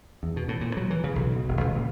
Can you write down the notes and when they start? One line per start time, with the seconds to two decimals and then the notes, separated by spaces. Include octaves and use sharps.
0.23 E2
0.36 B2
0.48 A2
0.61 A#2
0.77 F#3
0.90 E3
1.04 C#3
1.16 B1
1.36 B2
1.48 E1
1.61 C#2
1.75 A#2